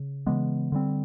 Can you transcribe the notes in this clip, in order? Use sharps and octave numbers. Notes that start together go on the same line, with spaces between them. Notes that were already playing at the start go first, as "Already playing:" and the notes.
Already playing: C#3
C#3 E3 G#3 B3
D3 G3 C4